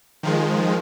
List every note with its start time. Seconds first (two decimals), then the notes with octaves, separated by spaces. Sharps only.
0.23 D#3 F3 G#3